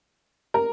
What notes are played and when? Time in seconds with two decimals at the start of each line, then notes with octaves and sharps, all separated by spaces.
0.54 A#4